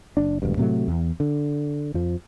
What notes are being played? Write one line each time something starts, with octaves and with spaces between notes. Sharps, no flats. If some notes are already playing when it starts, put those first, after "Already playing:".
F#1 D4
E1 D2 G2
A2 C3 F#3 A3
E2
D3
F2 F3